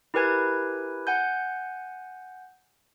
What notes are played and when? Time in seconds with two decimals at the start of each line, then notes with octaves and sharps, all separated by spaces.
0.14 E4 G4 A#4 B4 G#5 G#6
1.07 F#5 G#5 G6